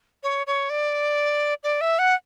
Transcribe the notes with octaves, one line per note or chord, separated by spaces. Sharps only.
C#5
C#5
D5
D5
E5
F#5